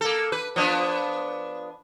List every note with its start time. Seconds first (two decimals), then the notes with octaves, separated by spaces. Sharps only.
0.01 A#3 A4
0.32 B4
0.56 F3 B3 D4